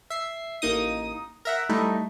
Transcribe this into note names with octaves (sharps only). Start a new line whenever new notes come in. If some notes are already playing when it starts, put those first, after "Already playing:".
E5 C7
A1 A#3 D#4 D#6
A#4 E5 F#5
G3 A3 D#4 E4